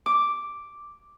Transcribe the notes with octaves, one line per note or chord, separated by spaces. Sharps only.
D6